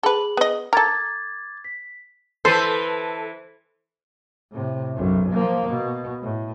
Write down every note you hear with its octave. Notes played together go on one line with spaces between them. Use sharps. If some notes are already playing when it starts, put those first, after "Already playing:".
G#4 A4 B4 F#7
B3 D#5
A4 A#4 D6 G#6 A6
B6
E3 A4 B4 C5
A2 C3
B1 F#2
F3 A#3
B2
A2